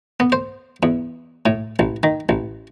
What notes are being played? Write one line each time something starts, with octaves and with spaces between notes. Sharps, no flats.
B3
C5
E2
A2
A1
D#3
A1